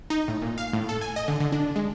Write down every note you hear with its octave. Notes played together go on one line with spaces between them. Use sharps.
D#4
A2
A#2
F5
A2
A4
G#5
D#5
D3
D3
D4
G#3